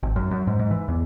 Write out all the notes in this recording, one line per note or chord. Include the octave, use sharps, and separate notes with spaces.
G#1
F#2
F#2
G#2
G#2
E3
E2